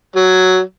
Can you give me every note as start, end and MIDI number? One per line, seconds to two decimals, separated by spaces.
0.16 0.61 54